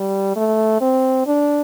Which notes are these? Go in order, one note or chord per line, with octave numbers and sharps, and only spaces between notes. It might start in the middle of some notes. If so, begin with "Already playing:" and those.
Already playing: G3
A3
C4
D4